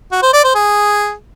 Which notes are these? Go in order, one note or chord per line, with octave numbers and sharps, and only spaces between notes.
F#4
C5
D5
C5
G#4